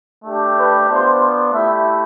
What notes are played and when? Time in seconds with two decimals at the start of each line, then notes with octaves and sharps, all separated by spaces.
0.24 A3 D4 G4
0.57 B4
0.88 B3 D4 F4 C5
1.53 A3 E4 G4 E5